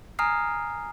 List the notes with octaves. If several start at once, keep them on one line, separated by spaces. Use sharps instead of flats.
G#5 A#5 D#6 F6 C7